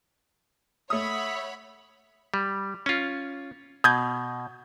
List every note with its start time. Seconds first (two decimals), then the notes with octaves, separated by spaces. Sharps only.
0.90 A3 C#5 E5 F#5 B5 D#6
2.34 G3
2.86 C#4 F4
3.84 B2 D#6 G6 G#6